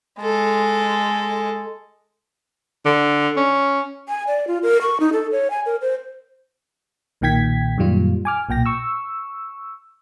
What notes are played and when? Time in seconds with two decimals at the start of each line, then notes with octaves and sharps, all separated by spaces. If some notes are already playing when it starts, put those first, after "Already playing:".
0.21 G#3 A4
2.86 D3
3.37 C#4
4.09 G#5
4.27 D5
4.47 F4
4.63 A#4
4.82 C#6
5.00 D#4
5.13 A4
5.32 C#5
5.50 G#5
5.66 A#4
5.82 C5
7.21 B1 A#2 D#3 G5 G#6 B6
7.78 F#2 A#2 D#3 G3 F4
8.25 G#5 D6 F6
8.49 B1 A#2 G5 A#6
8.66 C#6 E6